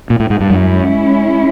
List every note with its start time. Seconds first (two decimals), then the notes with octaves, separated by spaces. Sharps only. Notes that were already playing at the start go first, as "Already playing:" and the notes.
0.10 A#2
0.20 A2
0.30 G#2
0.40 G2
0.50 F#2 G#3 C#4 E4